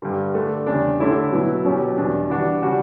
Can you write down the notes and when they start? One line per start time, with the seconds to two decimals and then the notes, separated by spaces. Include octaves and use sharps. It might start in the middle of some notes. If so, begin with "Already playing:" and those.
0.02 G2 D3 G3
0.34 D3 A3 D4
0.66 E2 C#3 G3 D4 G4
0.99 D3 A3 C#4 E4 G4
1.32 B2 F#3 B3 E4
1.65 B2 F#3 C#4 G4
1.97 E2 B2 G3 D4
2.30 E3 G3 D4 F#4
2.62 C#3 G3 D4 F#4